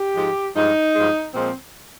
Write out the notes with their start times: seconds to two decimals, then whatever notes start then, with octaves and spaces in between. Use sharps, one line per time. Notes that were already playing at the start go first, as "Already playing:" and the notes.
Already playing: G4
0.14 G#2 F3 G#3
0.54 G2 F3 G#3 D#4
0.93 G2 F3 G#3
1.33 A#2 F3 G#3 C4